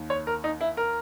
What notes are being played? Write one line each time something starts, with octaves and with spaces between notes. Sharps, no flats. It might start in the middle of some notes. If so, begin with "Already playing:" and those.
Already playing: D#2 D#3
C#5
A#4
D#4
E4
A#4